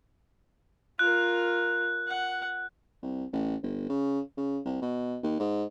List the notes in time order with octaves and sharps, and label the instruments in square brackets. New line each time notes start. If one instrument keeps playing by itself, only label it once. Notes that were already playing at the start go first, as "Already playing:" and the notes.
[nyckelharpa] F4 A#4 [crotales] F#6
[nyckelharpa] F#5
[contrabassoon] C2
A1
G1
C#3
C#3
C2
B2
D#2
G#2